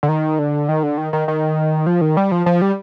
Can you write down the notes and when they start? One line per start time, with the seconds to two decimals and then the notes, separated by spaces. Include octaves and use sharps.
0.03 D3
0.09 D#3
0.39 D3
0.69 D#3
0.83 D3
0.98 D#3
1.13 D#3
1.28 D#3
1.86 F3
2.01 D#3
2.17 G3
2.32 F3
2.46 F3
2.62 G3